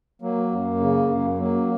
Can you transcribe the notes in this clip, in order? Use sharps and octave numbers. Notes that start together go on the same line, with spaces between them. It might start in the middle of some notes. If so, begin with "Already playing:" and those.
F#3 A#3
F#2
C#3
F#2
F#3 A#3